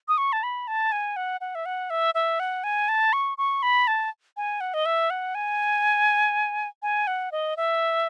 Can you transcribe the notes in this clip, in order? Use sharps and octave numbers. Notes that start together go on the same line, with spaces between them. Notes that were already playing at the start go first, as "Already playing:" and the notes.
D#6
C#6
A5
B5
A5
G#5
F#5
F#5
E5
F#5
E5
E5
F#5
G#5
A5
C#6
C#6
B5
A5
G#5
F#5
D#5
E5
F#5
G#5
G#5
F#5
D#5
E5